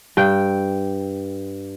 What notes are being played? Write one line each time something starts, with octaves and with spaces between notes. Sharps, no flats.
G2 G5